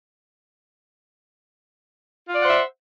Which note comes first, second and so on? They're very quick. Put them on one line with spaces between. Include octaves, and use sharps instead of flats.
F4 D5 F#5 C5 E5